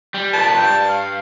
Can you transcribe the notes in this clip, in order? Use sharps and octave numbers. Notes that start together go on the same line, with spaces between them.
G3
C2 A#2 B4 A5
G2 G5
F5